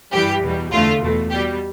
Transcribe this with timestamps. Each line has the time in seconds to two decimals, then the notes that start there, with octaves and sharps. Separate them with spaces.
0.12 G2 E3 G3 G4
0.42 E2 B2 G3
0.71 E2 D3 A3 F4
1.01 E2 B2 A3
1.30 B2 G3 G4